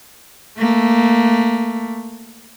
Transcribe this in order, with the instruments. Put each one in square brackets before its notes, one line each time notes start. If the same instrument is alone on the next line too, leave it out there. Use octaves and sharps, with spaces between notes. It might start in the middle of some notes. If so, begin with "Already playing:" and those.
[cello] A3 A#3